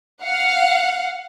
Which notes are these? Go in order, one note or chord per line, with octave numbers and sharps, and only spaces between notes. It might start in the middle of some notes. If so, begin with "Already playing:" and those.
F5 F#5